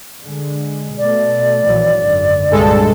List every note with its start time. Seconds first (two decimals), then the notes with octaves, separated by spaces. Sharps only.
0.23 D3 G#3
0.98 B2 A3 D5
1.65 A#1 E3 F#3
1.97 G#1 F#2 D3
2.51 C2 G2 A#2 G#3 A4